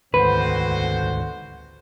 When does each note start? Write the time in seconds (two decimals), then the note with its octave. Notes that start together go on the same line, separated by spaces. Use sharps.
0.14 D2 G#2 D3 D#3 C4 F#4 B4 C5